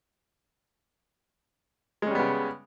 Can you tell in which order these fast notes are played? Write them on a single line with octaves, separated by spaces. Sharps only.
G#3 C#4 G3 B3 C#3